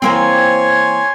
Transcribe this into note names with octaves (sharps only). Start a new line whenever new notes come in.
E3 A#3 C4 C#5 G#5 C6